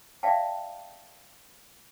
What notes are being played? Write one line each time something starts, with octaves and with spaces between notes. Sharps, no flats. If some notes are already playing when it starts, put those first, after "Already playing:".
D5 E5 F5 G5 A5